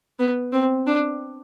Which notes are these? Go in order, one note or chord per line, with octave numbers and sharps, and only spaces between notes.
B3
C4
D4